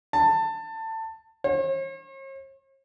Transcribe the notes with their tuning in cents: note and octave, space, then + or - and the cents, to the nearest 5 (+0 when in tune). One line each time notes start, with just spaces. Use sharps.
A5 +20
C#5 -45